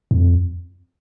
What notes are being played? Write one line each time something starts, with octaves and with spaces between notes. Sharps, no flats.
F2